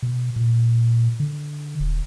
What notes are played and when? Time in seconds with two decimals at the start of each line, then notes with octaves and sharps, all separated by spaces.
0.02 B2
0.36 A#2
1.20 D3
1.80 D#1